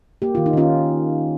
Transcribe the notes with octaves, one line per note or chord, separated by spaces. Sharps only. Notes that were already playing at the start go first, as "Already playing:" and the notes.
A#3 G4
D#3 F4
D#4
D#3 C#4 F4